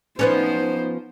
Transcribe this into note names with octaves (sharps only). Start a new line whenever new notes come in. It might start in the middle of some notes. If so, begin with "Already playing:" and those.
F3 B3 C#4 D#4 C5